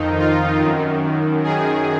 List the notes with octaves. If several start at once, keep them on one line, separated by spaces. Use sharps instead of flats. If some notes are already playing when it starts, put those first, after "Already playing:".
Already playing: F2 D#3 D#4
F4
F#2 D#3
F#2 D#3 G#4